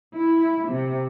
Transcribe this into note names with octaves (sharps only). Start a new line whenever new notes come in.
E4
C3